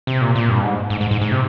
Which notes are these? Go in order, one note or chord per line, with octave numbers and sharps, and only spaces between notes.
C3
A#2
A#2
G2
G#2
G#2
G#2
G#2
G#2
C3